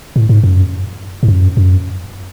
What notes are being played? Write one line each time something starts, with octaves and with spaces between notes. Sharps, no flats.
A2
G#2
F#2
G#2
F#2
F#2